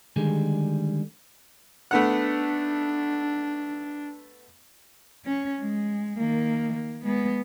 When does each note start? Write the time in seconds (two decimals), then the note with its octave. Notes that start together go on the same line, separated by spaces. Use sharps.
0.16 D3 D#3 G3 G#3 G#4
1.91 A3 B3 D4 F#5
5.25 C#4
5.62 G#3
6.19 D#3 A#3
6.73 A#3
7.04 G#3 B3